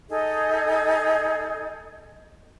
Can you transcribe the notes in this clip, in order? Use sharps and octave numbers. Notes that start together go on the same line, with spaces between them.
D#4 G#4 A4 D#5